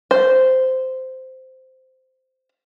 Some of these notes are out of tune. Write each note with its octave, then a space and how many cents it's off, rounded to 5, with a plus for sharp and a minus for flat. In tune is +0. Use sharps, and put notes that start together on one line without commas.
C5 -10